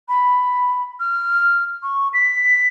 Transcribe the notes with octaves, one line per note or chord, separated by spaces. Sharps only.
B5
F6
C#6
B6